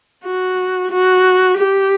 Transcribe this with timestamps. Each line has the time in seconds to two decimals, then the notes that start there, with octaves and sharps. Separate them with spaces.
0.25 F#4
0.91 F#4
1.58 G4